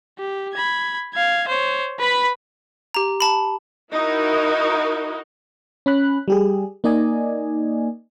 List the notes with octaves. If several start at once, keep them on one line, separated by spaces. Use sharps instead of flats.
G4
B5 G#6
F5 G#6
C5 C#5
B4 B5
G4 A#5
A5 B5
D#4 E4 F#4 A#4
C#4 B5 F#6
G3 G4 G#4
A#3 D#4 D5 D#5 G#5